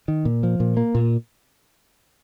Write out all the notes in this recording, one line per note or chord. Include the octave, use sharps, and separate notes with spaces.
D#3
A#2
F3
A#2
A#3
A#2